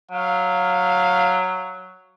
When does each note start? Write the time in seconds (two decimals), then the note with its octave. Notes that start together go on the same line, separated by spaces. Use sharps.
0.11 F#3 F5